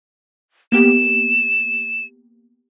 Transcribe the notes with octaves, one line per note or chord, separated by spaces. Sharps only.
A#3 B3 G4 E7